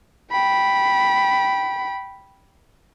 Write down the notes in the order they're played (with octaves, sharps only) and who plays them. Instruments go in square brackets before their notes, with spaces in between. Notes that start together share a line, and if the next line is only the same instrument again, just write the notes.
[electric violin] G5 B5